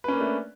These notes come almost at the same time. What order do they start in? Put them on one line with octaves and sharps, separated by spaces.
B4 C#4 A#3 D4 A3